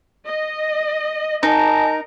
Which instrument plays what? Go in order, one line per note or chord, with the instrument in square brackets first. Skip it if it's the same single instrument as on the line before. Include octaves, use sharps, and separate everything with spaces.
[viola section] D#5
[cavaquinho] D#4 [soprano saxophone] A#4 [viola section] D#5 [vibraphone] G#5 A5